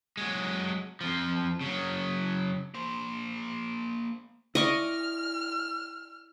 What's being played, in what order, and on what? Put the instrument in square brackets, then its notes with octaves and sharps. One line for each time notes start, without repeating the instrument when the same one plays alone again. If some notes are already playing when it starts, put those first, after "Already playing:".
[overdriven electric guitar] F#3 G#3
F2 F3
C#3 F#3
[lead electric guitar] A#3 C5
[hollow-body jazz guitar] E4 D5 [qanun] D#5 C#6 D6 [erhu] F6